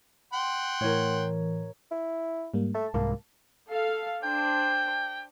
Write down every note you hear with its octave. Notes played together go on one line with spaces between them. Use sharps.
F#5 G5 C6
A2 E3 A#4 C#5
E4
G#2 G3 A#3
A3 A5
C2 G#2 A#3
A4 F5
D4 C5 G5